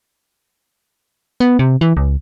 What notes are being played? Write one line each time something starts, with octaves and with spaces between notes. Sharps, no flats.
B3
C3
E3
C#2